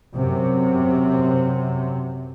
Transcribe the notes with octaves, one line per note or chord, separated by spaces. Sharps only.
F#2 C3